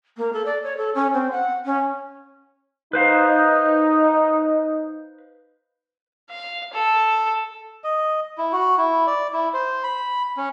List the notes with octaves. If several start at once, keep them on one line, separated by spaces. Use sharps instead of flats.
A#3
A4
D5
C#5
A4
C#4
C4
F#5
C#4
D#4 B4 C5 F5
F5
A4
D#5
E4
F#4
E4
D5
E4
C5
B5
C#4